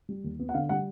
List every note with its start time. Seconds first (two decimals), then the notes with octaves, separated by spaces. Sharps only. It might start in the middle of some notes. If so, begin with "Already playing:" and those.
0.09 G3
0.24 D#2
0.39 B3
0.49 F#5
0.54 D3 F5
0.69 G3 F#5